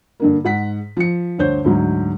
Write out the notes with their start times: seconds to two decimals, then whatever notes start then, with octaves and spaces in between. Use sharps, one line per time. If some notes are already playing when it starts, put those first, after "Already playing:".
0.20 G2 D3 A#3
0.45 G#2 F#5 B6
0.97 F3 C#7
1.38 D2 G2 C5 C#5 G6
1.64 D2 G#2 F#3